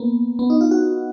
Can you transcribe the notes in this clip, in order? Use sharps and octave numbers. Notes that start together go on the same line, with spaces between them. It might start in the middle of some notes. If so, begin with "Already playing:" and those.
Already playing: A#3 B3
B3
D#4
F4
F#4